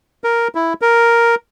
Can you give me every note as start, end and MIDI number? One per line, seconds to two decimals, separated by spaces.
0.24 0.48 70
0.55 0.73 64
0.82 1.35 70